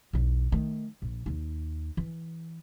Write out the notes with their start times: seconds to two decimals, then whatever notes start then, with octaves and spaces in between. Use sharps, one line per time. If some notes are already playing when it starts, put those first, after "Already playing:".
0.13 B1 E2
0.52 D#3 A3
1.02 A#1
1.26 D#2 D#4
1.97 E3